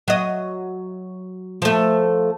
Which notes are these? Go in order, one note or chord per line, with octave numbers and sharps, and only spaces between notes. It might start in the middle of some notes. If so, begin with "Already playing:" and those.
F#3 D#5
F3 A3